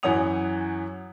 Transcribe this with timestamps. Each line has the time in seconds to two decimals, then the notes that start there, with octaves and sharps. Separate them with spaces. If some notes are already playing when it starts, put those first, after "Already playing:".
0.03 F#2 E3 C#5 F#5 D#6 F7